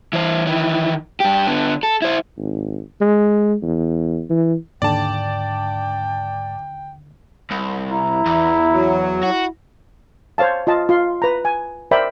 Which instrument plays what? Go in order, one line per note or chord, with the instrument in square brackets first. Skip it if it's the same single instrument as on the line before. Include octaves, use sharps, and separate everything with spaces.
[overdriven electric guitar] E3 C5
D#3 E3
G2 G4
D3 B3
A4
E4 C5
[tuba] G#1
G#3
E2
E3
[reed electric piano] D#2 D3 [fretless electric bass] G#2 D4 [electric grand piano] D5 A5 [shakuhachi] G5
[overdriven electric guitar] C2
[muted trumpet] E4 [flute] A#5
[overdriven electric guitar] E2
[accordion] F#3
[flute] E4 [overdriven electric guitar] F#4
[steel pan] C5 C#5 F5 A5
F4 D#5 A5
F4 C6
B4 A#5
G#5
A#4 C5 D5 E5 G5 B5